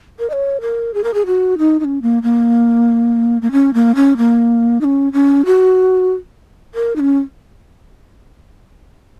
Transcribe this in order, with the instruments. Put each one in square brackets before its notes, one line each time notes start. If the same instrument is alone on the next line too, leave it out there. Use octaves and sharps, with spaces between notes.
[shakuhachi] A#4
D#5
C#5
A#4
G#4
A#4
G#4
F#4
D#4
D#4
C#4
A#3
A#3
A#3
C#4
A#3
C#4
A#3
D#4
C#4
C#4
F#4
A#4
D#4
C#4